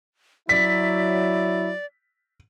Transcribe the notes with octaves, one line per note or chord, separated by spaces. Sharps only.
F#3 E4 D5 B6